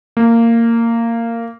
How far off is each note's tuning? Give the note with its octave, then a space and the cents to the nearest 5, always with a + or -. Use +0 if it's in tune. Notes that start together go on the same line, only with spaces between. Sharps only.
A#3 -15